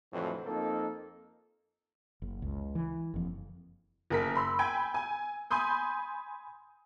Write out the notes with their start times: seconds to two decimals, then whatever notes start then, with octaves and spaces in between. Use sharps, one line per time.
0.13 F2 A2 D3 E3 F#3
0.46 F2 A#3 D#4 A4
2.22 F#1
2.42 C#2
2.75 E3
3.14 F#1 F2
4.10 F#1 A#4 B6
4.35 B5 C6 E6
4.59 G5 G#5 B5 G#6
4.94 G#5
5.51 G#5 B5 C6 D#6 G6